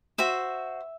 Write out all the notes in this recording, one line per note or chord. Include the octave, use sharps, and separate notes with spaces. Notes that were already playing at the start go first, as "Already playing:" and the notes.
F#4 C5 E5